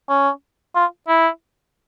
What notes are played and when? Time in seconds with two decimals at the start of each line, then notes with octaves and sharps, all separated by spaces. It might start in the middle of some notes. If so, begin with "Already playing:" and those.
0.09 C#4
0.75 F4
1.08 E4